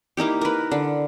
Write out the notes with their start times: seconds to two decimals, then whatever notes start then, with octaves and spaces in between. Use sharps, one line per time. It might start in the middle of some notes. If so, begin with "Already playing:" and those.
0.17 A#3 D#4 E4 G4
0.41 A#4 B4
0.71 D3